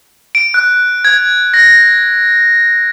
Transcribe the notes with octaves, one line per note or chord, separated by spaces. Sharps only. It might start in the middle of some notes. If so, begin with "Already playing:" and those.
D7
F#6
G#6
A#6